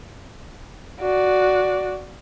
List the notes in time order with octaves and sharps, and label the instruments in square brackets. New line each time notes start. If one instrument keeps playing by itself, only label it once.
[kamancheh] F#4 D5